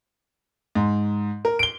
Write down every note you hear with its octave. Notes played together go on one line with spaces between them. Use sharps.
G#2
A#4
D7 G7